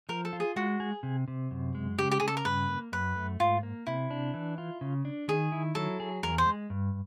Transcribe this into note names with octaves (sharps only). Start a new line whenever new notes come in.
F3 A#4
A4
F4
G#4
G#3 F#4
G#4
C3
C3
F#2
G#3
C#3 G4
G4
C#3 G#4
A4
A#4
G2 B4
A#3
F#2 B4
A3
G#2 F4
A#3
C3 E4
D4
E3
F4
C#3
D4
D#3 G#4
E4
F#3 A4
G#4
E2 A#4
C5
G#3
G2